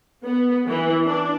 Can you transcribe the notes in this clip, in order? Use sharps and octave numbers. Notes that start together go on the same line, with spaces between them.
B3
E3
D4